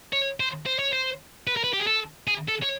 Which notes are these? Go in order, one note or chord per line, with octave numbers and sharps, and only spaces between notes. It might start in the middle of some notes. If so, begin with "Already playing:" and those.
C#5
C5
C5
C#5
C5
B4
A#4
B4
G4
G#4
A4
G#4
A4
C#5